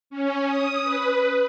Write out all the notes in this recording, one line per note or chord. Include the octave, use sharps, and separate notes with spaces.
C#4
D#6
B4